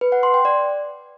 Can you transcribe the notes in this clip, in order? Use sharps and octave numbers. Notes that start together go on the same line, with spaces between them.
B4
F#5
C6
G5
D5